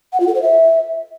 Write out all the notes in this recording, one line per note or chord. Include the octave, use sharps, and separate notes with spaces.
F#5
F4
A4
C5
E5